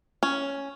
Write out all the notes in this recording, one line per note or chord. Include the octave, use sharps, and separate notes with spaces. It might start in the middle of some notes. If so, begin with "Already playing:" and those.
C#4